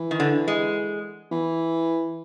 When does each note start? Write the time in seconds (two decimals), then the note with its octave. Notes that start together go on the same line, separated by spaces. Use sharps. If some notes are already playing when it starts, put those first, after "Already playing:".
Already playing: E3
0.11 D#3
0.20 D3
0.48 G#3
1.32 E3